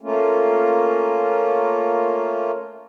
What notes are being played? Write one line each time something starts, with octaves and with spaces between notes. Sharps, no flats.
A3 A#3 C#4 F4